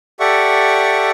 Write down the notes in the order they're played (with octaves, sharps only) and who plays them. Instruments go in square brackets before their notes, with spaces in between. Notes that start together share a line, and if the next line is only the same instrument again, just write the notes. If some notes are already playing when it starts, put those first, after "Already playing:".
[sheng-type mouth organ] G4 A4 D5 E5 F#5 C#6